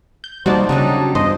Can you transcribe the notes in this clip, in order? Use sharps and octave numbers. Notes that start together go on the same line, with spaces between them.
G6
D#2 F3 G3 D#4 F#4 C5 D5 A5
C#3 F#3 G3 D4 D#4
E2 G2 C5 D#5